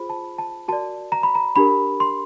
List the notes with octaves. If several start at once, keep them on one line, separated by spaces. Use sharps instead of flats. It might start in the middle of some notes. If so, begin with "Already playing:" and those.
Already playing: F4 G#4 C5 B5
A5
A5
F#4 A#4 D5 A5
A#5
B5
A#5
D4 G4 A#4 B5
C6